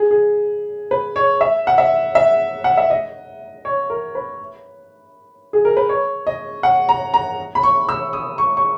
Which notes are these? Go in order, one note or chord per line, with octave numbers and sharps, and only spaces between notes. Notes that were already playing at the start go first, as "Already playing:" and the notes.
Already playing: G#4
G#4
B4
C#5
E5
F#5
E5
E5
F#5
E5
D#5
C#5
A#4
B4
G#4
A#4
B4
C#5
D#5
F#5
A#5
A#5
B5
C#6
E6
D#6
C#6
C#6